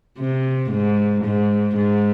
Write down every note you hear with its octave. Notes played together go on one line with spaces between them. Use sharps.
C3
G#2
G#2
G#2